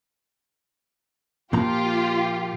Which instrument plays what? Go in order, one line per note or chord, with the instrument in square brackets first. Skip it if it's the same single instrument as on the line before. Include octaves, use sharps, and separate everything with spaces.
[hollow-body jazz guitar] A#2 F3 A#5 [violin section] F4 G4